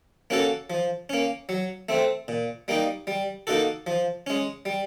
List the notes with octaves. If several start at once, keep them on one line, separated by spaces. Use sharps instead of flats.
A#3 C#4 F#4 A4
F3
A#3 C#4
F#3
A3 C4
A#2
G3 A#3 D#4
G3
A#3 D#4 F#4 A4
F3
G#3 C#4
G3